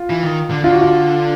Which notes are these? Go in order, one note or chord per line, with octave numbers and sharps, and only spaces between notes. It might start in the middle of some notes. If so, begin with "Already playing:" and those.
Already playing: F4
E3
D#3
D3
D3 F4
F#4
F4